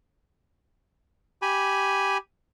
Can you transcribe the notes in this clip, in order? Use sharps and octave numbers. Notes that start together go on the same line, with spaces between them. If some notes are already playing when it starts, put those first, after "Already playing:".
G4 G#5 B5